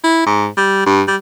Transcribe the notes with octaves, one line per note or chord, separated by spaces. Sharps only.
E4
G#2
G3
G2
G3